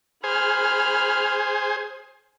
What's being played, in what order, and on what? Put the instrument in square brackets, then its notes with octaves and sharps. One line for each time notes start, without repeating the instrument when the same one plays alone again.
[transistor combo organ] G#4 C5 [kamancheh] B5 F6